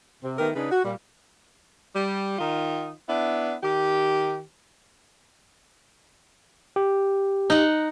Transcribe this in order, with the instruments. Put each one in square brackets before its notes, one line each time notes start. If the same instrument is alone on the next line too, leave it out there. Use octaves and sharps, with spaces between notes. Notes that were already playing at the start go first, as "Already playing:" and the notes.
[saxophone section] C3
D#3 A3 B3 G4 A#4
C#3 D4 D#4 G#4 B4
F#4
A#2 G3
G3
D#3 D#4 F4
B3 D4 E4
D#3 G4
[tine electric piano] G4
[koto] D#4 F#5